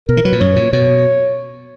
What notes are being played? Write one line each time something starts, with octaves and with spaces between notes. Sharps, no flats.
B2 A#4
E3
F#3 B4
A#2
F#2 C#5
A#2
B2 C#5